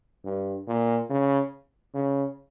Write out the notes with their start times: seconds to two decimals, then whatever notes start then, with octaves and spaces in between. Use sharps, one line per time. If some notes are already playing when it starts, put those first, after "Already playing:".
0.25 G2
0.67 A#2
1.10 C#3
1.94 C#3